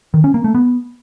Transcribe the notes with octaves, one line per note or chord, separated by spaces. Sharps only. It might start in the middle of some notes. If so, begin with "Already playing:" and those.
D#3
C#4
A#3
A3
B3